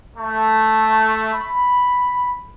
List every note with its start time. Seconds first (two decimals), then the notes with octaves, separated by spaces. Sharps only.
0.17 A3
1.33 B5